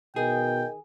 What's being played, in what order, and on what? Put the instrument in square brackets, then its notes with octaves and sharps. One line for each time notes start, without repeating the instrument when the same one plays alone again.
[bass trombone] B2 [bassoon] D#3 [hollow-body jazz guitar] G#4 [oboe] G5